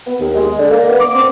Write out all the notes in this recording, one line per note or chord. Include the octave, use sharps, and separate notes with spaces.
B3
D#2
G#3
D3
A#3
B3
D6
C4